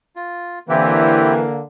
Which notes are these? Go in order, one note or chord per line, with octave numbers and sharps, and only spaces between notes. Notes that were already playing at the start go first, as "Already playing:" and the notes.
F4
D3 E3 A#3 C4 E4 G4